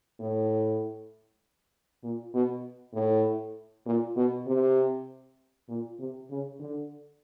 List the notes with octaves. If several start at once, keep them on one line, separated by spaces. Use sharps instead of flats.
A2
A#2
B2
A2
A#2
B2
C3
A#2
C3
C#3
D3